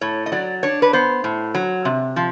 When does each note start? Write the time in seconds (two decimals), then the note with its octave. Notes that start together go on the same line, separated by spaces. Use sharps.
0.01 A2 C#5
0.26 D#5
0.32 F#3 D5
0.63 D4 C#5
0.82 B4
0.93 B3 C5
1.24 A2
1.55 F#3
1.85 C3
2.16 F3